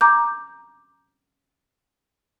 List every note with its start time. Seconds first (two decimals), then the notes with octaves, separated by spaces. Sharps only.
0.01 A#5 D6 G6